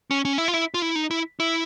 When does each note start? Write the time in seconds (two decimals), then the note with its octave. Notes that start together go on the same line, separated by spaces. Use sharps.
0.11 C#4
0.25 C#4
0.38 E4
0.48 F4
0.54 E4
0.74 F4
0.82 E4
0.95 D#4
1.11 E4
1.40 E4